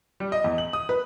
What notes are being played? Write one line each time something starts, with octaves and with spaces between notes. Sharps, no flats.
G3
D#5
E2
F#7
D#6
B4